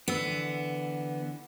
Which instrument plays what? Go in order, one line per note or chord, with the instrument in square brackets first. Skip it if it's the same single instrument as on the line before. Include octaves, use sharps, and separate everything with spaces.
[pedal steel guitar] D3 E3 E6 [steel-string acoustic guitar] B3